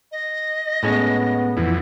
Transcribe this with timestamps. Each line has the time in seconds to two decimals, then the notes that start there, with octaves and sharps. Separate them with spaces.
0.12 D#5
0.83 A2 G#3 B3 C#4
1.57 F2 E3